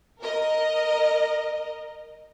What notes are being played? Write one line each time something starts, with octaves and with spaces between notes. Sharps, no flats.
A#4 D#5